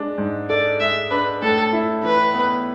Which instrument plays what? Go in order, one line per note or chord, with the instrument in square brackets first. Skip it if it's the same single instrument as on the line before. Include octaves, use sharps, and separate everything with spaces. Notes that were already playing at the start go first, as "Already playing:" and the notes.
Already playing: [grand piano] G#3 D4
G#2
[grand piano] A4 [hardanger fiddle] D5
[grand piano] G#3 [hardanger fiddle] E5
[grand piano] D4 [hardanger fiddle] B4
[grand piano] A2 [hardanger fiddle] A4
[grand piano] E4
[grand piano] E3 [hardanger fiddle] B4
[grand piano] B3